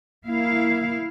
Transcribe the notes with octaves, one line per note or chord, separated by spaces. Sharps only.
A#3 E4 F5